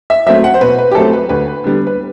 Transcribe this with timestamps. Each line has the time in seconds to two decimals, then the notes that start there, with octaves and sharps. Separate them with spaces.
0.10 E5
0.26 F#3 A3 C4 E5
0.44 F#5
0.54 C5
0.61 B2 B4
0.78 B4
0.91 G4
0.95 F#3 A3 C4 A4
1.13 B4
1.29 D2 B4
1.64 D3 G3 B3
1.87 B4